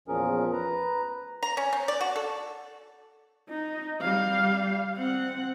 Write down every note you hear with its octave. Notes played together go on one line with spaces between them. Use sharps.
E2 A#2 F3 C#4 G#4 A#4
B4 A#5
A#5
C#4
C4
D5
F#4
A4
D#4
G3 F5
C4 F#5